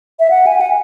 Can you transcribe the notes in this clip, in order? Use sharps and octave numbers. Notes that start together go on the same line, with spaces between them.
E5
F#5
G#5
F#5